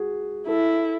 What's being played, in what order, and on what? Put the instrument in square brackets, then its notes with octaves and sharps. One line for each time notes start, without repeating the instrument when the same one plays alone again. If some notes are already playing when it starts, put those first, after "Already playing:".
Already playing: [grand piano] F#4 G#4
[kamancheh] E4 [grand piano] A4